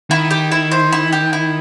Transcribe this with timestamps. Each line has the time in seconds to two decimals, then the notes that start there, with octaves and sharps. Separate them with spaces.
0.10 D#3 E4
0.31 G4
0.52 E4
0.71 C5
0.92 E4
1.13 G4
1.33 E4